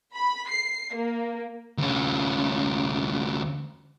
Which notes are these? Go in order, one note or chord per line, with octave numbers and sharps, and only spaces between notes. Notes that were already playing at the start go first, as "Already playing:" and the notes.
B5
C7
A#3
D2 C#4